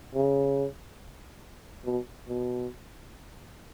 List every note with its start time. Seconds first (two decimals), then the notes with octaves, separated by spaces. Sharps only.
0.15 C#3
1.85 B2
2.28 B2